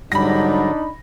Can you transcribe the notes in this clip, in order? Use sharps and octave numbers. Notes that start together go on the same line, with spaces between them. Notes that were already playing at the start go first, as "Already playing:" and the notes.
G#2 D3 F#3 G3 D4 D#4 B5 A#6